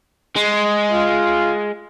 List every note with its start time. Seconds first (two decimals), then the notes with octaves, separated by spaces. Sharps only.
0.36 G#3
0.92 F4